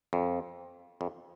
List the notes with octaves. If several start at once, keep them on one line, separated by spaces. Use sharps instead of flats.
F2
F2